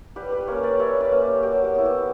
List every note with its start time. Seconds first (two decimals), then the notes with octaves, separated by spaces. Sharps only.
0.16 G3 G4 B4
0.32 G4 B4
0.47 A#3 C#4 A#4 C#5
0.63 B4 D5
0.79 G3 C#5 E5
1.00 B4 D5
1.11 A#3 C#4
1.21 G4
1.43 F#3 G4
1.64 F#4
1.74 B3 E4
1.85 G4